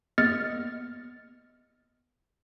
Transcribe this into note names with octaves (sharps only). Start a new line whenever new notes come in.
A#3 B3 D#5 F6 A6 C#7